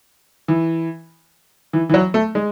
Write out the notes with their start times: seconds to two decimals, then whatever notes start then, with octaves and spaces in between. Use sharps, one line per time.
0.48 E3
1.73 E3
1.89 E3
1.94 F#3
2.14 A3
2.35 G#3